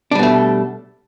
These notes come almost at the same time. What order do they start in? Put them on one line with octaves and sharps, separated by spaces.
D4 G3 B2 A3